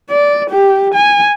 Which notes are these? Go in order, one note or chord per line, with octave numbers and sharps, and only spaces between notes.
D5
G4
G#5